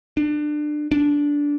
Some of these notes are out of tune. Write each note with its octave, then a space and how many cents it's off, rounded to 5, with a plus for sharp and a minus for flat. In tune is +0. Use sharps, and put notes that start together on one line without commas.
D4 +25
D4 -15